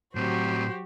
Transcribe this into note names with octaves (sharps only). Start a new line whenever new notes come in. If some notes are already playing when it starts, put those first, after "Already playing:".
A2 F#3 C4 F#4 G4 C5